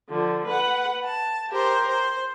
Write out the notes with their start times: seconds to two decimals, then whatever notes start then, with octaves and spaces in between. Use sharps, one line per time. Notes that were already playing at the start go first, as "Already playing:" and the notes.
0.10 D3 F3
0.46 B4 F#5
1.05 A5
1.49 G4 A#4 C5
1.89 C5